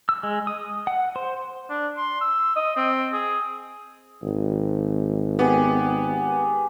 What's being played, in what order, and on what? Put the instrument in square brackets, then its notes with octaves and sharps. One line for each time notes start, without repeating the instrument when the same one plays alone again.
[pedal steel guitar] E6
G#3
D#6
F#5
C5
[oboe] D4
C6
E6
D#5
C4
G#4
[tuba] G#1
[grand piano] B3 [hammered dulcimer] G4 G#4